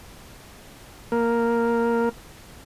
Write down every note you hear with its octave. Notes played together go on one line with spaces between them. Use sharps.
A#3 A#4